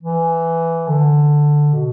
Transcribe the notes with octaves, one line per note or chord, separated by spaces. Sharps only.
E3
D3
B2